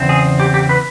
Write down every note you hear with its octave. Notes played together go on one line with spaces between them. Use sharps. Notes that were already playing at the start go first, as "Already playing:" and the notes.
Already playing: E2 C#3 C4
G#4
G4
G4
B4